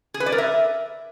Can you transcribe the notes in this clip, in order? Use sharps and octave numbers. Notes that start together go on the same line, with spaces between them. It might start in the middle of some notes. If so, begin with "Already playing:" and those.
G#4
B4
D5
A#4
E5